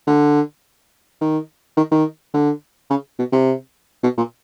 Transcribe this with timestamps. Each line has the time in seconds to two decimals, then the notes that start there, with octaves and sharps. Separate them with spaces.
0.07 D3
1.21 D#3
1.77 D#3
1.91 D#3
2.34 D3
2.90 C#3
3.19 B2
3.32 C3
4.03 B2
4.17 A#2